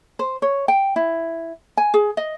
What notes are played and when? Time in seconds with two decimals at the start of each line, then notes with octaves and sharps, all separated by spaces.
0.19 C5
0.42 C#5
0.68 G5
0.96 E4
1.77 G#5
1.94 G#4
2.17 D#5